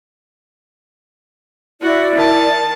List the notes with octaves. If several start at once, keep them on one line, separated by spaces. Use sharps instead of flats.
E4 F#4 D5
D#3 A5